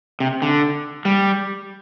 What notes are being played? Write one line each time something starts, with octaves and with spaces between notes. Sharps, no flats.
C3
D3
G3